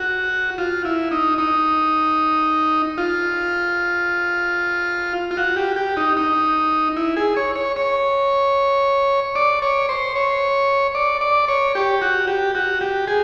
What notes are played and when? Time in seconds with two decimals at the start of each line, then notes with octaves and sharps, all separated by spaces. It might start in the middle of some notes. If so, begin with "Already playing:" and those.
Already playing: F#4
0.58 F4
0.85 E4
1.11 D#4
1.38 D#4
2.98 F4
5.31 F4
5.37 F#4
5.56 G4
5.76 G4
5.97 D#4
6.17 D#4
6.97 E4
7.17 G#4
7.37 C#5
7.56 C#5
7.76 C#5
9.35 D5
9.62 C#5
9.89 C5
10.16 C#5
10.95 D5
11.21 D5
11.48 C#5
11.75 G4
12.02 F#4
12.28 G4
12.55 F#4
12.81 G4
13.08 G#4